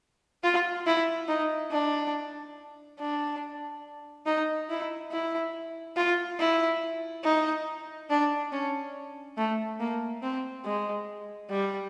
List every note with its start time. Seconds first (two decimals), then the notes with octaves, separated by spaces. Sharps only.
0.44 F4
0.87 E4
1.28 D#4
1.72 D4
2.99 D4
4.26 D#4
4.70 E4
5.12 E4
5.97 F4
6.40 E4
7.24 D#4
8.10 D4
8.52 C#4
9.38 A3
9.80 A#3
10.23 C4
10.65 G#3
11.50 G3